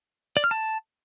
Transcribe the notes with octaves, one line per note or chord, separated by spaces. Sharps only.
D5
F6
A5